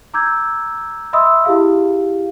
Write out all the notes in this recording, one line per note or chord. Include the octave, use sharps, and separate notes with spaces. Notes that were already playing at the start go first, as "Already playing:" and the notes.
A#5 D6 E6 G6 G#6
D#5 E5 B5 C6 D#6 E6
E4 G4 G#4 F5